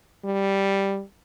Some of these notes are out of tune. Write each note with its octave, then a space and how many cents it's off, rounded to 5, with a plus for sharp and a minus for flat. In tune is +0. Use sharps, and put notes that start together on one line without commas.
G3 +0